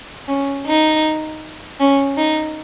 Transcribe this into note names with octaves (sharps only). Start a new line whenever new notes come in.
C#4
D#4
C#4
D#4